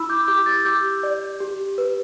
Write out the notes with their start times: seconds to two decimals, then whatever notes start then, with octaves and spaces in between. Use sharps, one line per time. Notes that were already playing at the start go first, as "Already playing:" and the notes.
Already playing: E4 B5 E6
0.09 D6 G6
0.28 G4 D6 G6
0.46 E6 A6
0.65 G4 D6 G6
1.03 D5
1.40 G4
1.78 B4